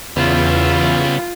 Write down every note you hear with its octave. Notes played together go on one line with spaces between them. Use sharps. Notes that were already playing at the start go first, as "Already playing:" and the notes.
E2 C#3 G3 B3 E4 F4